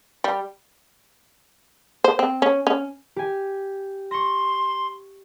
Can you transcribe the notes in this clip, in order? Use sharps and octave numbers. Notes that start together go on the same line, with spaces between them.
G3
C5
C4
C#4
C#4
G4 G#5
C6 C#6 A#6